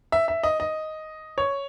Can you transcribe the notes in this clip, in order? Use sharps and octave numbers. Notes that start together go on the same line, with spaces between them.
E5
E5
D#5
D#5
C#5